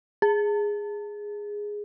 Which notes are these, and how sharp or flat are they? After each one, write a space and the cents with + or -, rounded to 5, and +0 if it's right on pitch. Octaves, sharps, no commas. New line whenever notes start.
G#4 -5